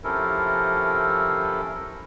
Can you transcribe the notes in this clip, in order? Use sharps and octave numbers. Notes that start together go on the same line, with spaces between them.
C3 F3 C#4 E4 A4 A#4